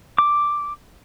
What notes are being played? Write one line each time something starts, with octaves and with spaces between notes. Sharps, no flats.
D6